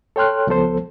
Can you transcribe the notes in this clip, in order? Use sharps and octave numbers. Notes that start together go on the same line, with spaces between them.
A4 C#5 G5 C6 F6 F#6
C#2 F3 B3 A4 C5